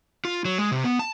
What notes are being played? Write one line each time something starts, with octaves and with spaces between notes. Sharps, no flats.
F4
F#3
G#3
C3
B3
A5